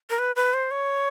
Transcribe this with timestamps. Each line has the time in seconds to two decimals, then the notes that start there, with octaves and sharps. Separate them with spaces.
0.10 A#4
0.19 B4
0.36 B4
0.54 C5
0.71 C#5